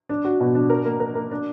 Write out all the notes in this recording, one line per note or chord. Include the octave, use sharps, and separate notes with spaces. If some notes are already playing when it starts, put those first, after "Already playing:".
D4
F#4
B2
D4
A#4
A#3
A#4
A#3
D4